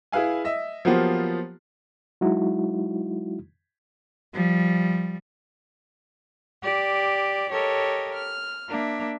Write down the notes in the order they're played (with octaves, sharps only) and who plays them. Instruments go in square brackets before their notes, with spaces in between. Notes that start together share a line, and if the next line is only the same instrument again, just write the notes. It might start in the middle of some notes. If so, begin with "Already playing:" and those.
[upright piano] E4 G#4 B4 F5 G#5
D#5 E5
F3 F#3 A#3 B3 F4 G4
[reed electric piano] F#3 G#3 D#4 E4 F#4
[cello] F3 G3
[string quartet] G4 D5
G4 A4 A#4 C#5 D#5
F6
A#3 D4 E5